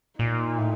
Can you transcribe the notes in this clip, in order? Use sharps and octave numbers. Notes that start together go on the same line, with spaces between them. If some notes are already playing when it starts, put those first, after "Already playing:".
A#2 D#4
A2